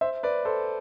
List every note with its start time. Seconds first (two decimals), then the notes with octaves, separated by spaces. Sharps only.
0.01 C5 E5
0.23 B4 D5
0.45 A4 C5